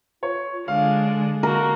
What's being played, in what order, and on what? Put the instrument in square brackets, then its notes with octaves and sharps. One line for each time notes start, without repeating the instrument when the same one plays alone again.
[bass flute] F4 [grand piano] C#5
[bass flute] D3 [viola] G#3 D4 [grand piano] F5
[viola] A#3 F#4 [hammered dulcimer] A#4